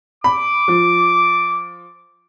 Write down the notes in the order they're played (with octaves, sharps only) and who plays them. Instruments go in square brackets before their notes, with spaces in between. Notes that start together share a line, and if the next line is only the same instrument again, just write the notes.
[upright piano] B5 [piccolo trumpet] D6
[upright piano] F3